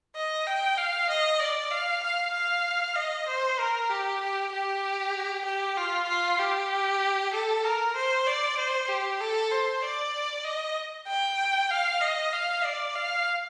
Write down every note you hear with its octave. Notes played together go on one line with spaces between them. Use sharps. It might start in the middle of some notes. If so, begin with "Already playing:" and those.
D#5
G5
F5
D#5
D5
F5
F5
F5
D#5
C5
A#4
G4
G4
G4
G4
F4
F4
G4
A4
A#4
C5
D5
C5
G4
A4
C5
D5
D#5
G5
F5
D#5
F5
D5
F5